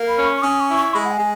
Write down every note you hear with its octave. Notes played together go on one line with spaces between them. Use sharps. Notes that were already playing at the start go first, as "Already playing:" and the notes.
Already playing: A#3
B5
C#4
C#6
C#6
C#4 D#6
C#6
E4
C#6
G#3 B5
F#5
G#5
G#3